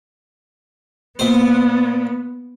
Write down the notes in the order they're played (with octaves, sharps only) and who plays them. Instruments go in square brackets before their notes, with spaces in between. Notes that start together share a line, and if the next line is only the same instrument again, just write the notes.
[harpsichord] A#2 C5 [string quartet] B3